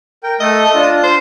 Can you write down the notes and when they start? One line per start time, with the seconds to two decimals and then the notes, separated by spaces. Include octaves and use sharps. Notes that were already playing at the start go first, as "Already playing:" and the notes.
0.23 A#4 G5
0.40 A3 A4 D#5
0.75 D4 F4
1.04 C5